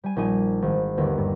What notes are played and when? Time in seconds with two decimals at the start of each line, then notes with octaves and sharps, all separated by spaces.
0.04 G3 G#5
0.16 A#1 D#4 G#5 D#7
0.62 G#1
0.97 G1 D#2
1.18 G2